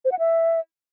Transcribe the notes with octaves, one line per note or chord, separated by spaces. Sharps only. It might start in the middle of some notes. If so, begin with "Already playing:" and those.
C5
F#5
E5